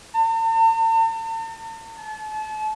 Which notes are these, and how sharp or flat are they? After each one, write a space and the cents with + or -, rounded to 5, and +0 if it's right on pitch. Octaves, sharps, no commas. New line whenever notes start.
A5 +45
A5 -35